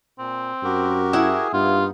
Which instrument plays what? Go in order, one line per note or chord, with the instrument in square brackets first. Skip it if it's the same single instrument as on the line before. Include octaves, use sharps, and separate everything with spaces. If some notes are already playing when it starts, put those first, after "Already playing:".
[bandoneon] A#2 [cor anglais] C4
[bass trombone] F#2 [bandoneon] F#4 G4 A#4
[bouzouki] E4 F#5 [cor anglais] G#4
[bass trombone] G2 [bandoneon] A#3 B3 D#4 [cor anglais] F4